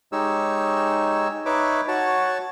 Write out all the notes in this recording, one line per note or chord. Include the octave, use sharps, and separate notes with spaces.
G#3 D#4 G4 C#5 E6
D#4 B4 C#5 E5 D6
F#4 C#5 A5